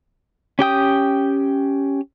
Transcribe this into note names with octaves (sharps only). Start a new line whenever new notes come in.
C#4 G4 G5 D#6